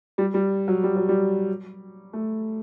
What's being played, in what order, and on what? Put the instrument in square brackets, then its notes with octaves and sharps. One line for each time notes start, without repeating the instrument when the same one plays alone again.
[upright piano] G3
G3
F#3
G3
F#3
G3
A3